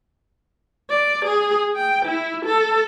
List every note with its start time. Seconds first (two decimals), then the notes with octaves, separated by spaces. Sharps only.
0.90 D5
1.25 G#4
1.76 G5
2.06 E4
2.45 A4